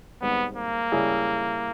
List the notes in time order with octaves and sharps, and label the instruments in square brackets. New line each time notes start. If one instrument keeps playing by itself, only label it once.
[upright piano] G#1 G#2 G3 [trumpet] B3
[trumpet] A#3
[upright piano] C#3 G3 C#4 E4 G#4